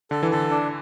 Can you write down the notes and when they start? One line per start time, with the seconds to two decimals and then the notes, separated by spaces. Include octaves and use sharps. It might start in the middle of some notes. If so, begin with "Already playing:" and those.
0.11 D3 A4
0.23 E3
0.31 D3 A4
0.50 D4